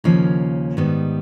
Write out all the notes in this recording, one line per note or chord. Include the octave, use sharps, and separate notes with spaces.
D#2 C#3 F3 A#3 C#4
G#2 D#3 G3 B3